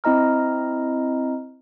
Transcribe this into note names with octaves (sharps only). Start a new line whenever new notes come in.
C4 E4 D#5 A#5 F6